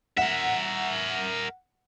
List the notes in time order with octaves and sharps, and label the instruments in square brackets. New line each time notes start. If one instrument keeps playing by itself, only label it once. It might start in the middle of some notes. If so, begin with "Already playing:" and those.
[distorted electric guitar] A#4 E5 [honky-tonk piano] F#5